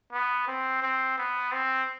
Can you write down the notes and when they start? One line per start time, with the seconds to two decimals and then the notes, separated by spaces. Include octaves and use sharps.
0.12 B3
0.48 C4
0.82 C4
1.18 B3
1.52 C4